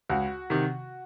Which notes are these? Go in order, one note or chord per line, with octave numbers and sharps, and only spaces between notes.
C#2 F#4
C3 D#3